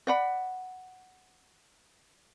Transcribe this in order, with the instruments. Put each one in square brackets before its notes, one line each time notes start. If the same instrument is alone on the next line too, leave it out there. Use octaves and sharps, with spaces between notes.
[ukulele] D5 F#5 B5